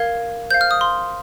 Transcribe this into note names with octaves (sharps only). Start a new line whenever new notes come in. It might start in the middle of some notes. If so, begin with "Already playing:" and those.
Already playing: A#4 F5 G#6
C5 F5 G6
F6
D#6
C6